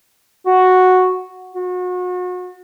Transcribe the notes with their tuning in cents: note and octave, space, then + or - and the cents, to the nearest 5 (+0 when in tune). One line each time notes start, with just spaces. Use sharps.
F#4 -5
F#4 -35